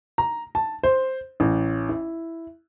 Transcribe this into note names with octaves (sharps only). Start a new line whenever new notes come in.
A#5
A5
C5
A1
E4